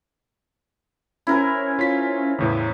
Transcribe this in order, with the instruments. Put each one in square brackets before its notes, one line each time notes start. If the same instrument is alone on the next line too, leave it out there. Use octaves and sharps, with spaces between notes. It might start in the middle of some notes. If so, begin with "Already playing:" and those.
[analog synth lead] C#4 [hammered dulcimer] E4 A#4 C5
[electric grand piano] F4 B6
[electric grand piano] E2 A2 E3 [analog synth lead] C#3